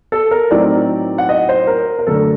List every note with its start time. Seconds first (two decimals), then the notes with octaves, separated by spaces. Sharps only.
0.12 A4
0.31 A#4
0.51 A2 F#3 C4 D#4 D5
1.18 F#5
1.29 D#5
1.49 C5
1.67 A#4
1.99 A#4
2.07 F#2 D3 A3 D4 A4